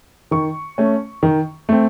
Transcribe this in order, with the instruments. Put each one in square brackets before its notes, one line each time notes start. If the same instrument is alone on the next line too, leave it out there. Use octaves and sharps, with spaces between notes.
[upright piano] D#3 C#6
A3 C#4
D#3
A3 C4